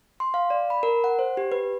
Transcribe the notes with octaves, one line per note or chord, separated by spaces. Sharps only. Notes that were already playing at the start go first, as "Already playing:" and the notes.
C6
F5
D5
B5
A#4
F#5
C5
G4
B4